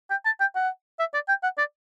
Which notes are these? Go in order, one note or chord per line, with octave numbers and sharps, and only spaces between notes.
G5
A5
G5
F#5
E5
D5
G5
F#5
D5